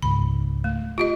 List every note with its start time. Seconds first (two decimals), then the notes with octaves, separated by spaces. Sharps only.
0.02 C#2 G#2 B5
0.64 A3
0.98 F4 G4 D#5